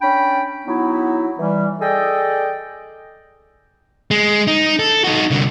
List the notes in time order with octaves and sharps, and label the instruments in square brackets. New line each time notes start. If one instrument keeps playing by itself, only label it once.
[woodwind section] C#4 D4 G5 B5
F#3 B3 D#4 E4
E3 G3
G#4 A4 D5 D#5 G5
[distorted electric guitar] G#3
D#4
A4
D#4 F#4
C2 D3